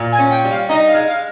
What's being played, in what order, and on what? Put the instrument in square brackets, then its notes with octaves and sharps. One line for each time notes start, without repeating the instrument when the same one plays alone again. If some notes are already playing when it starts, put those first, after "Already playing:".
Already playing: [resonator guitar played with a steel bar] A#2
[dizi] G#5
[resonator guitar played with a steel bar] C#4
[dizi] G5
[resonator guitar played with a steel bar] G3
[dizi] F5
[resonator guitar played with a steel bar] D#4 [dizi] D#5
[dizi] F5
[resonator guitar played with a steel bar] G#3
[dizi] F5